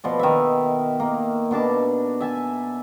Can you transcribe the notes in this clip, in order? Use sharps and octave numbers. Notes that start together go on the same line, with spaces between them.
B2 F3 D5
D#3 E5
A#3
B2 D4 A5 D6
E5 G#5 A5